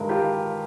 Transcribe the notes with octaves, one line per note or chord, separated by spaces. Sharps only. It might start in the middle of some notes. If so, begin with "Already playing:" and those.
Already playing: G2 D#3 G#3 A#4
F4 G4